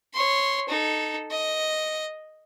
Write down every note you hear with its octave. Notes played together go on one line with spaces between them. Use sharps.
C#5 C6
D#4 A4
D#5